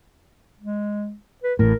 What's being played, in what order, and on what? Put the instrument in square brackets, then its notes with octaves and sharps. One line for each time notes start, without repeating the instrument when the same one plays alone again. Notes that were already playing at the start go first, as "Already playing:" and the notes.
[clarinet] G#3
B4
[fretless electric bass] A1 A2 [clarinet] A#4